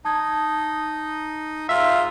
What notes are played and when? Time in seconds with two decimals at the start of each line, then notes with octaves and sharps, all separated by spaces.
0.05 D#4 A5 D#6 G#6
1.69 G#2 F4 E5